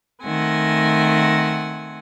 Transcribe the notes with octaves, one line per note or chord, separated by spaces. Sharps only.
D#3 A3 C4 F#5 G#5